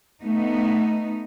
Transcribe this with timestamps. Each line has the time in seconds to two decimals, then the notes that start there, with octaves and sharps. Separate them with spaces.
0.20 A3 B3 D#4